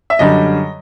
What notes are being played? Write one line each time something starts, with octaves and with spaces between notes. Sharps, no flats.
E5
F#2 D3 G3 D#5